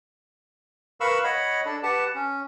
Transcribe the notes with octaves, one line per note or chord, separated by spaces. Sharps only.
A#4 B4 F5 B5 C#6 E6
C#5 D#5 F#5 B5
D4 A4
G4 B4 F#5 A5
C#4